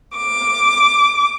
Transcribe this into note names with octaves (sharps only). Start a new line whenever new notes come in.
D6